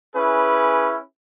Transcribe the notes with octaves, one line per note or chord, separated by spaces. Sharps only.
C#4 E4 G#4 B4